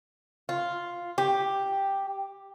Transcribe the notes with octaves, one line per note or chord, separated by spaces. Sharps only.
F4
G4